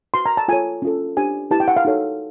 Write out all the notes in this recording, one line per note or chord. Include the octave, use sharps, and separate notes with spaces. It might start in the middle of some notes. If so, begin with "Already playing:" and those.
F#4 B4 C6
A#5
A5
F4 A4 C#5 G#5
C#4 F4 A4
D4 G4 C5 G#5
E4 G4 B4 A5
G5
F#5
F5
D#4 F#4 A4 C#5